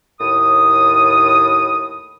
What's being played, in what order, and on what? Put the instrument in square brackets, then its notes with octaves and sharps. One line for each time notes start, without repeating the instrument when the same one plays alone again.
[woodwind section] D#2 A2 D#6